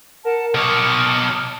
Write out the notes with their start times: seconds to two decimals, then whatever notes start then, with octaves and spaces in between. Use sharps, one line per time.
0.25 A#4 F#5 A5
0.55 B2 C#5 A5 D6 D#6 F6